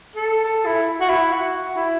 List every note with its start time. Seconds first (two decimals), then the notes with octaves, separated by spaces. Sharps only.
0.16 A4
0.45 A4
0.66 E4
1.01 F#4
1.09 E4
1.32 F#4
1.76 E4